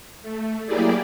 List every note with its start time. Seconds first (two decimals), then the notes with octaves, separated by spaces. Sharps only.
0.21 A3
0.66 F#3 A#3 E4 G4 G#4 D5